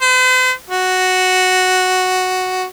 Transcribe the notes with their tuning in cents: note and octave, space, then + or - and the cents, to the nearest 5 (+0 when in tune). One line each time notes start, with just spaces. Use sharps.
C5 -45
F#4 +0